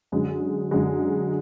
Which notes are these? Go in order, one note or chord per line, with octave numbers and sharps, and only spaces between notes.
F#2 D3 G#3
F#2 D3 G#3